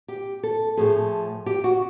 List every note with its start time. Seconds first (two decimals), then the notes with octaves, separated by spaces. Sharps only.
0.08 G4
0.43 A4
0.77 A2 F3 G#4
1.46 G4
1.64 F#4